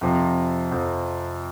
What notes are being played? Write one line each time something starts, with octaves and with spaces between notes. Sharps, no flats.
F2 C3 F3 C4
F2 C3 F3 C4